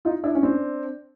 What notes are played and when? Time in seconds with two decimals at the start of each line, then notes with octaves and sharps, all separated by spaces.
0.05 D#4 F4
0.24 D4 E4
0.35 C#4
0.43 C4 D4